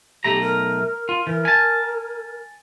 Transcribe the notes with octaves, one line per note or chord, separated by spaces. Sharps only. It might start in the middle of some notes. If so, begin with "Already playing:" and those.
B1 A3 G4 A#5
A#4
F4
E3 A#4
G#5 A5